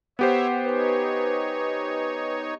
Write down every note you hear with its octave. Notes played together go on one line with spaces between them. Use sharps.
B3 G4 C5 C#5 E5 F#5
D#4 B4 C#5 G#5